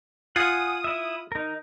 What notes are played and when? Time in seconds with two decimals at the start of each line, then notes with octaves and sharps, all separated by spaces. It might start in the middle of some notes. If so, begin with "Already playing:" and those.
0.36 F4 F#5 G#5 D#6
0.84 E4 E5
1.32 D#4 A#4